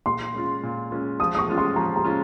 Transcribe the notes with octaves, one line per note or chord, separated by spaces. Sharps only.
A#2 C6
G#3 C#4 F4
A#2
G#3 C#4 F4
F3 D#6
D#6
C#6
G#3 C#4 F4
C6
F3 A#5
A#5
G#3 C#4 F4